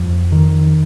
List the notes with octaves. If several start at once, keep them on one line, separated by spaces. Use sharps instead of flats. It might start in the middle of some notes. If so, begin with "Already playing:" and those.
Already playing: F2
D#3